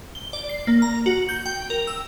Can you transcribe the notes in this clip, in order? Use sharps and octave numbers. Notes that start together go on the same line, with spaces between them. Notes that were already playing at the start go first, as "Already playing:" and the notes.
G7
D5
C7
A#3
A#5
F#4
G6
G5
A#4
E6